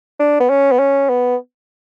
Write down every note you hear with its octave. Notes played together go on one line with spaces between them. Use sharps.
D4
B3
C#4
B3
C#4
B3